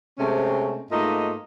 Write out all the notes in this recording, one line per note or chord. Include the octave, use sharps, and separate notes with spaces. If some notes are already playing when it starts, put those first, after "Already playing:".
C3 G#3 A3 C4 C#4
G#2 A3 A#3 D#4 F4 D#5